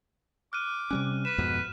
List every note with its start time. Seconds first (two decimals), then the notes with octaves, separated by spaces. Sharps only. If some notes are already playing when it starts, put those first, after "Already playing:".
0.53 D6 F6 F#6 D#7
0.91 C3 G3 C#4 F#6
1.25 B4 E7
1.38 F2 G#2 B2